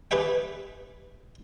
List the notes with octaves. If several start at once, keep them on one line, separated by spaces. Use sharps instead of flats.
G4 G#4 B4 E5 G5